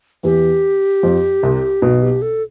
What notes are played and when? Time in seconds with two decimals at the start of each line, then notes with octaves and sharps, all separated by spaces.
0.23 E2 E3 G4
1.03 F2 F3
1.43 C2 C3
1.82 B1 B2 F#4
2.02 G4
2.22 A4